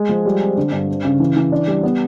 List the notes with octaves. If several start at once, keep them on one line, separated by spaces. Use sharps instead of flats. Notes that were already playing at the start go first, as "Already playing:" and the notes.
Already playing: G#3
F3
G3
C4
D3
G2
C4
C#3
E3
E3
D4
G3
B3